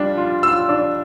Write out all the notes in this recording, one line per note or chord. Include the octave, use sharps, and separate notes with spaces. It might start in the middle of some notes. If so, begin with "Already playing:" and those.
Already playing: G3 D4 F4
F4
F4 E6
D4